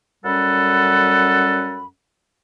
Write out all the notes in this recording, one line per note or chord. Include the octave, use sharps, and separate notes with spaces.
F#2 G3 C#4 A4 F#5 B5